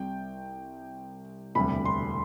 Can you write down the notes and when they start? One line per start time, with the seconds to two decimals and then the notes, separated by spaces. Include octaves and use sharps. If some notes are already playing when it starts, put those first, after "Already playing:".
Already playing: C2 C3 G3 G5
1.55 E1 D2 C3 G3 B5
1.85 C6